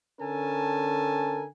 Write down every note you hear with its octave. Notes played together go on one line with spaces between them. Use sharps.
D3 C#4 A4 A#4 G#5 A5